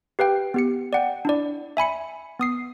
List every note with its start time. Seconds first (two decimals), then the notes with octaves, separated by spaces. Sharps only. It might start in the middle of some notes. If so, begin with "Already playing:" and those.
0.19 G4 B4 F5 G5
0.54 B3 G4 C#7
0.93 D5 F#5 G5
1.25 D4 E4 D5
1.77 E5 G#5 B5 C#7
2.39 B3 D#6 C7